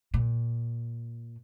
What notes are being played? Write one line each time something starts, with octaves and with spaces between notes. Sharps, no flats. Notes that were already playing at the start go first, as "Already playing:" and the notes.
A#2